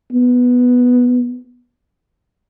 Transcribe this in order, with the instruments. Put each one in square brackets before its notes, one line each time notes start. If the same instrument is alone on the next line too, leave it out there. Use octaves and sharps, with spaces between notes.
[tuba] B3